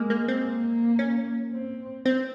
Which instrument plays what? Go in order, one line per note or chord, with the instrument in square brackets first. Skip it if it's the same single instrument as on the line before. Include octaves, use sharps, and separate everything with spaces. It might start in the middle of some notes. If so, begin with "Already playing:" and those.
Already playing: [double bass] G#3 [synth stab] A#3
[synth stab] A#3
C4
[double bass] A#3
[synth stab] C#4
[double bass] C4
[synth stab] C4